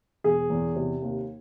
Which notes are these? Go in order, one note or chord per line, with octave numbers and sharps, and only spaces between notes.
E1 G#4
E2
C3
D#2